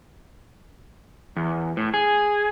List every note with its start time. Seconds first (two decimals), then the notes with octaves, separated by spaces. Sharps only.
1.36 E2
1.77 A2
1.94 G#4